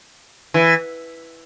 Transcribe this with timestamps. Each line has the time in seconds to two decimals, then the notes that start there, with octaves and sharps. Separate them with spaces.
0.54 E3